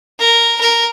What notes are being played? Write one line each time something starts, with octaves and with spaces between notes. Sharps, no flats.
A#4
A#4